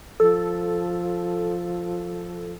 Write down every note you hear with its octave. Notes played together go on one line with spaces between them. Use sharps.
F3 A4